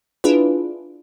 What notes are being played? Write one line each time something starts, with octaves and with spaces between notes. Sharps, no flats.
D4 E4 F4 G#4 B4